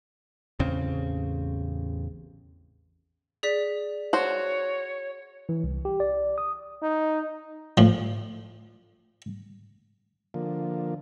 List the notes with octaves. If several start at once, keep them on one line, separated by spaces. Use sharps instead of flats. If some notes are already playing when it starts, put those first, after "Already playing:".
A1 E2 C#3 C4
G#4 D5 B6
F#4 C5 C#5 F#7
E3
C2
G4
D5
D#6
D#4
A2 F3
D3 F3 A#3